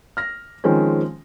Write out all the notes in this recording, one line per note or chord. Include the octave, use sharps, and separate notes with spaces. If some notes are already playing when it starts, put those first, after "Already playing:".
F6 A#6
D#3 F3 G#3 C4 C#4